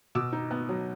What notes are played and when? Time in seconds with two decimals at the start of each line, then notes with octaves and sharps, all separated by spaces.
0.15 B2 D6 E6
0.33 D#4
0.51 B3
0.69 F#3